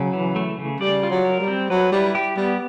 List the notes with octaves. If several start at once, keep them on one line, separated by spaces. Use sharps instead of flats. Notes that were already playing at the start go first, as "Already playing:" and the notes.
Already playing: C#3 F#3
E3
A3
C#3
G3 D5
F4
F#3
A#4
G3
C4
F#3 B4
G3 E4
G4
G3 B3